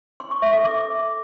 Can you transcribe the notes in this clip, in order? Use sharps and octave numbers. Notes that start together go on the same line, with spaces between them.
C6
C#6
E5
A4
D6